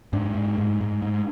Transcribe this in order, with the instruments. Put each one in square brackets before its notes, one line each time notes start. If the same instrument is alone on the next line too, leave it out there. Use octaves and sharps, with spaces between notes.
[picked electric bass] G#2 D4
G#2
G#2
G#2
G#2